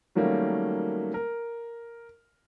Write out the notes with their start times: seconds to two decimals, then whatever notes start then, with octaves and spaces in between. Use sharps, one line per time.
0.15 D#3 F#3 G3 A3 A#3 C#4
1.14 A#4